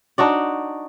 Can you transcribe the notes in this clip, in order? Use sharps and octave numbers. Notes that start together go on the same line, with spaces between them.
D4 D#4 F#4 D5